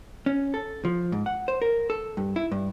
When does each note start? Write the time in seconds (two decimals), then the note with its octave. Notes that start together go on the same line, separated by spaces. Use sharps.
0.26 C#4
0.54 A4
0.85 F3
1.12 G#2
1.26 F#5
1.48 C5
1.62 A#4
1.90 A4
2.17 G2
2.36 E4
2.52 G2